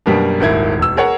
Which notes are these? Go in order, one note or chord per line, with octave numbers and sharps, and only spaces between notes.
F#2 B2 G3 A#3 B3 D4
D#1 G#1 A#3 E4 G#6
E1 E6
G#4 A#4 C#5 F#5